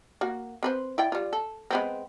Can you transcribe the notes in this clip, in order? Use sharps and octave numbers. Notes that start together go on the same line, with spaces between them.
A#3 F#4
C4 B4 C5
E4 D5 G5
G3 F4
A4
G#3 B3 C4